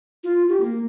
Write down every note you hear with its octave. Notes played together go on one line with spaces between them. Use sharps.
F4
G4
A#3